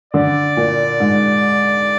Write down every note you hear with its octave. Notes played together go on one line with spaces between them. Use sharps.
D3 D5
A#2
G#2